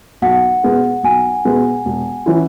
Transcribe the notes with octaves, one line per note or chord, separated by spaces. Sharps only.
B1 F#5
B2 G#3 B3 G#4
B1 G#5
B2 G#3 B3 G#4
E1
E3 C#4 E4